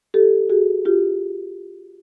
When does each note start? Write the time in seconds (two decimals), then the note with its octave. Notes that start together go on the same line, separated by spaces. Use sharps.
0.14 G4 A4
0.50 F#4 G#4
0.85 F4 G4